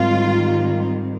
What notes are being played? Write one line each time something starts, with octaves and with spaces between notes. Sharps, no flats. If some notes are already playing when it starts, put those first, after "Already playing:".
Already playing: G#2 D#3 G3 C4 F4